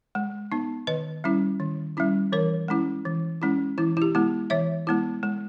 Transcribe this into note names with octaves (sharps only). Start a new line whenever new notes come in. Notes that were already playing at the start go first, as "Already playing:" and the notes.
G#3
B3 D#4
D#3 B4 D#5
G3 C#4 E4
D#3
G3 C#4 E4
E3 A#4 C#5
G#3 C#4 E4
E3
G#3 C#4 E4
E3 E4
E4
G4
G#3 B3 E4
E3 C#5 E5
G#3 B3 E4
G#3